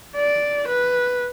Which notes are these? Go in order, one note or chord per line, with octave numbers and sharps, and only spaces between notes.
D5
B4